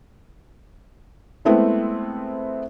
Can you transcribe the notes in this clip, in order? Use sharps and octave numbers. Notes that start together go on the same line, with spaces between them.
G#3 A3 B3 C4 E4